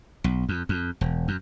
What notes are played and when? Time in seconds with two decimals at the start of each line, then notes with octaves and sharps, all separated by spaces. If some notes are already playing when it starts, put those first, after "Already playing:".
0.24 B1
0.49 F2
0.69 F2
1.01 E1
1.28 F#2